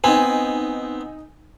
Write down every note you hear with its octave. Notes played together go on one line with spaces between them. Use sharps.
B3 C4 D#4 G#5